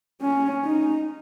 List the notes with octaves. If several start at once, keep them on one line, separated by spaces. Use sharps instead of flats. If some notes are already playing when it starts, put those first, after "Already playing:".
C#4
D#4